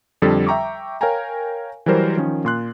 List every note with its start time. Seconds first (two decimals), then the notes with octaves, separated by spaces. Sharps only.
0.22 F2 D3 G3 A4
0.47 E5 G5 A#5 C#6 D6
1.01 A#4 C#5 F5 G5 G#5 A#5
1.86 E3 F#3 G3 A#4 C5
2.17 D#3 F3 C#4
2.45 A#2 C6 F#6